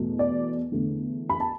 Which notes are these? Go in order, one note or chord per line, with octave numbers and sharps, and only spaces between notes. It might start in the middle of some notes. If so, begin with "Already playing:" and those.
Already playing: E2 B2 A3
D5
E2 D3 A3
B5
A5